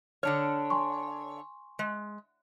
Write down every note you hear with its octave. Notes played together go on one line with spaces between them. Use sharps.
D3 D4 C#5 F6
G#5 C6 C#6
G#3